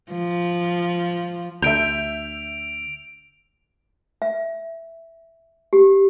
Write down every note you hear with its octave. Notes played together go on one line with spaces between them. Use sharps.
F3
D2 D3 E5 G6 D7 F7
E5
G4